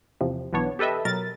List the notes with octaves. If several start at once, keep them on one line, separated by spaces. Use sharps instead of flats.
E2 C3 F3
B1 E3 B3 D4 C#5
G4 A4 B4 D#5 E5
B2 F#3 A#4 A6